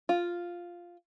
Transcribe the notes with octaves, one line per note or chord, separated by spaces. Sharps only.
F4